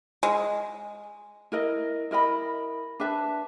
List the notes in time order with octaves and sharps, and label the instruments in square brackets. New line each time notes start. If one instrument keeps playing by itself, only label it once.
[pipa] G#3
[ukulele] E4 A#4 D#5
E4 A#4 D#5 B5
D4 B4 E5 A5